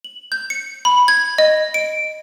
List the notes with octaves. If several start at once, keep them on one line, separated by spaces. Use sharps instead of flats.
F#7
G6
C#7
B5
G#6
D#5
D7